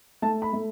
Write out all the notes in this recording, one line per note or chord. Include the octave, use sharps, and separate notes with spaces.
A3 A5
B5
A3